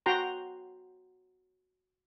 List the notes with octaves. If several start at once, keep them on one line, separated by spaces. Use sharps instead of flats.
F#4 G5 A#5 C6